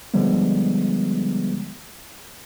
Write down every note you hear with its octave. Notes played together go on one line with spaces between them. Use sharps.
D3 F3 G3 G#3 B3